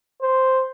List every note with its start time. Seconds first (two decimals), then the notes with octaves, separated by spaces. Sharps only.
0.22 C5